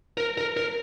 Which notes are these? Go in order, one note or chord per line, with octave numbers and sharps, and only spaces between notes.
A#4
A#4
A#4